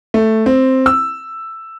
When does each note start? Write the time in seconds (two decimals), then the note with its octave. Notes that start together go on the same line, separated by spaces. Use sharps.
0.14 A3
0.46 C4
0.86 E6